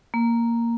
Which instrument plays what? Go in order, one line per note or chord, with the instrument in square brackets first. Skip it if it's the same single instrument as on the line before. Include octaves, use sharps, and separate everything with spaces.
[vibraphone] A#3